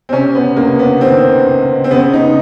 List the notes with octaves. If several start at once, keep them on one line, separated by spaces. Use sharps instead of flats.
C4
C3 C#4
B3
C#2 A#3
B3
D#3 C4
C#2
C4
C#3 B3
D#4